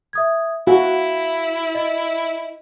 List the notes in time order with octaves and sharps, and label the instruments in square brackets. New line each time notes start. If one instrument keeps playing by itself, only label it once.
[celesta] E5 D#6 G#6
[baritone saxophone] E4 [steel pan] F#4 [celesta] F5
[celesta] D#5